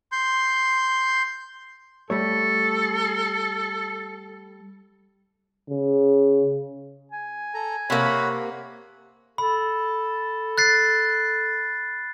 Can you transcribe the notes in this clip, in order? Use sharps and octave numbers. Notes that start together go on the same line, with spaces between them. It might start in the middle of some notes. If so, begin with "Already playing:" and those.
C6 G6
G3 A3 A4 C#5
C#3
G#5
A4 A#5
C3 A#3 C#5 F#5 B5
A4 B5
F#6 A6 C7